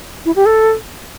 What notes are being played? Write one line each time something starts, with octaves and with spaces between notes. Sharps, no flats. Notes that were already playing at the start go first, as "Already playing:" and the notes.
E4
G4
A4